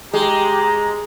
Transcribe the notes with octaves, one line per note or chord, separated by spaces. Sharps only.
G#3 G4 G#4 A#5